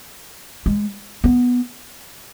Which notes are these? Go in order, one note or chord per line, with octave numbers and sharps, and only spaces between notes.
G#3
B3